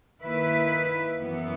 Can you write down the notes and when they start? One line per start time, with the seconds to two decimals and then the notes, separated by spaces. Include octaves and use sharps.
0.21 D#3 A#3 E4 B4
1.18 F#2 E3 B3